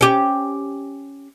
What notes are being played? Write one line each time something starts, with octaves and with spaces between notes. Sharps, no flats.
C#4 G4